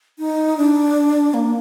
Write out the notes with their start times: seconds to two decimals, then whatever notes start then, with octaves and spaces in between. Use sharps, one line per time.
0.19 D#4
0.57 D4
1.34 A#3